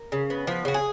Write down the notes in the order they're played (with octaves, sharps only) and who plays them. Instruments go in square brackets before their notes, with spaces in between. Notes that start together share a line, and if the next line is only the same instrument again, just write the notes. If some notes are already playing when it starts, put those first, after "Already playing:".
Already playing: [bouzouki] A#4
C#3
B3
F3 B4
C#3 F#4
G#4